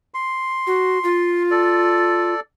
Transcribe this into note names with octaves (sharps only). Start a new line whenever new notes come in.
C6
F#4
F4
A4 D5